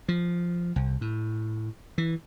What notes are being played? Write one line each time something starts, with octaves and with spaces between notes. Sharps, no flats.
F3
C2
A2
E3